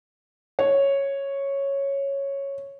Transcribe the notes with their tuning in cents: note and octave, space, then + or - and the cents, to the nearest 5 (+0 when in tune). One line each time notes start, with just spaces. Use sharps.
C#5 -5